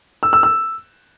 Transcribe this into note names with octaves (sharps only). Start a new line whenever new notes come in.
E6
E6
E6